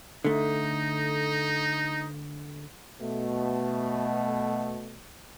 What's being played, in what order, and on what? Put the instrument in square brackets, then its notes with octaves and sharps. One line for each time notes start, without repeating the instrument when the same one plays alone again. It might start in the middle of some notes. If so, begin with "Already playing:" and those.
[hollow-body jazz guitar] D3 A3 [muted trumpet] D#4
[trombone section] B2 A3